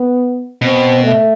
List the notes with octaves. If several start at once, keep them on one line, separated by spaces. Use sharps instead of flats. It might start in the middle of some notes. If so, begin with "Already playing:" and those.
Already playing: B3
B2 C4
A3